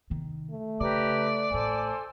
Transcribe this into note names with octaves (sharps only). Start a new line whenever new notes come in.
C3 D#3
A3
C#3 G4 B4 D5 A#5
A1 A2 A4 C5 G#5